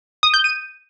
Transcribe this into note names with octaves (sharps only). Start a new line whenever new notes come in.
D#6
G6
D#7